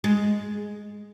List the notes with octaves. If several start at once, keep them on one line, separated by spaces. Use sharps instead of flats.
G#3